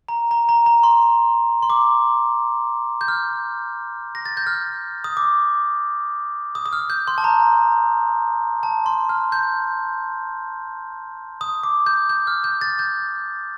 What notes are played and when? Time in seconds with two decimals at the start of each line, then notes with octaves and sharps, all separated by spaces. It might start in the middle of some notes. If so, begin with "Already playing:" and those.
0.09 A#5
0.31 A#5
0.49 A#5
0.66 A#5
0.83 C6
1.63 C6
1.70 D6
3.01 G6
3.08 F6
4.15 A#6
4.25 A6
4.37 G6
4.47 F6
5.04 D#6
5.17 D6
6.55 D#6
6.66 D#6
6.73 F6
6.90 G6
7.08 C6
7.18 A5
7.24 A#5
8.63 A5
8.86 C6
9.09 F6
9.32 G6
11.41 D#6
11.63 D6
11.86 G6
12.09 G6
12.27 F6
12.44 G6
12.61 A6
12.79 G6